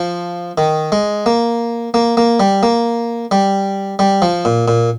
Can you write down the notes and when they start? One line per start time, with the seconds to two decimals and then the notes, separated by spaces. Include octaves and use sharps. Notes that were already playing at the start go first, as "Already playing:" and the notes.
Already playing: F3
0.58 D#3
0.92 G#3
1.26 A#3
1.94 A#3
2.17 A#3
2.40 G3
2.63 A#3
3.31 G3
3.99 G3
4.22 F3
4.45 A#2
4.68 A#2